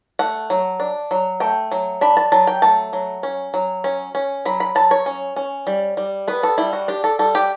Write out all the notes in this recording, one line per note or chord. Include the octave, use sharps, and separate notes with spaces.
A3 F#5
F#3
D4
F#3
A3 G5
F#3
D4 B5
A5
F#3 A5
G5
A3 A5
F#3
C#4
F#3
C#4
C#4
F#3 B5
B5
F#3 A5
C#5
C#4
C#4
G3
G3
B3 B4
A4
G3 E4
F#4
D4 G4
A4
G3 A4
G4